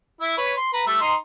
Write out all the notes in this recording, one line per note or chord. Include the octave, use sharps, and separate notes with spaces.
E4 E5
B4 C#5
C6
B4 A#5
G3 A3 E5
D#4 C6